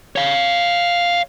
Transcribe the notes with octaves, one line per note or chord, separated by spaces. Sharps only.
C#5 F5